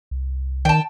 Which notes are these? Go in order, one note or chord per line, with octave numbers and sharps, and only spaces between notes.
C2
D#3 G5 A5